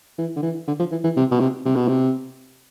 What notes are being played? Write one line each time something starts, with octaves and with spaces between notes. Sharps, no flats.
E3
D3
E3
D3
F3
E3
E3
C3
B2
C3
C3
B2
C3